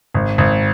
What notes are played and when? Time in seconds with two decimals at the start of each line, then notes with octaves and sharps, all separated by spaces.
0.14 G#1
0.38 G#1